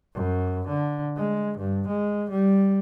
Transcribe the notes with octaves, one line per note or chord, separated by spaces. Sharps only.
F#2
D3
G#3
G2
G#3
G3